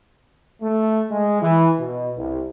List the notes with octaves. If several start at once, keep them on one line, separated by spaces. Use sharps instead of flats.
A3
G#3
E3
B2
C2